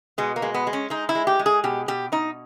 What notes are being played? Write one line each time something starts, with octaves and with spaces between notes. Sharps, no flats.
B2 G#3
A#3
G#3
B3
G#3
C#4
G#3 D#4
E4
G#3
G4
G#3
G#4
B2 G4
B2 G4
B2 D#4